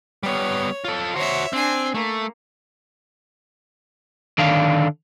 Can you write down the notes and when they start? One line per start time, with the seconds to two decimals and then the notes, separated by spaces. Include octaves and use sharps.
0.23 G3 B3 C#5
0.85 F4 A4
1.16 F#4 C5 C#5 E5
1.53 C4 D4 G#5
1.94 A3 A#3
4.38 D3 D#3 D4 F5